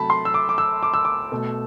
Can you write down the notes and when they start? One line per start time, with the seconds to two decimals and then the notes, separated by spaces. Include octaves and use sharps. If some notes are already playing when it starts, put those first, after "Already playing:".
Already playing: C3 F#3 A3 A5 B5
0.10 C6
0.25 E6
0.34 D6
0.49 D6
0.58 E6
0.83 D6
0.94 E6
1.05 D6
1.32 B2 A3